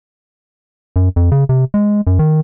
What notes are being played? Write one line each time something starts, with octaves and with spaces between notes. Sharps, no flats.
F#2
F2
C#3
C3
G#3
F#2
D#3